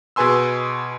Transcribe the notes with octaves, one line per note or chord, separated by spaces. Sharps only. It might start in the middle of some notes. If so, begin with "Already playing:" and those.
B2 G#4 B4 G#5 C6 E6